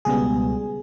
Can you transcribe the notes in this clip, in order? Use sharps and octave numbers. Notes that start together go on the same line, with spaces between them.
C#2 B2 G3 B3 G#4